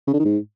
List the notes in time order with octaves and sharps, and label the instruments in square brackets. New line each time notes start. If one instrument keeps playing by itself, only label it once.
[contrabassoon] C#3
D3
D#3
G#2